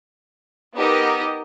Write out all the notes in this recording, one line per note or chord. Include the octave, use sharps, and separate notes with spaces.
B3 D#4 G4 A#4 D#5